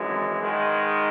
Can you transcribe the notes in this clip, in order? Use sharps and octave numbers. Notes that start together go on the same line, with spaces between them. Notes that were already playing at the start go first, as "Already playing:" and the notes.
Already playing: G#1 F#2 E3 G#3
G#2 D#3 G#3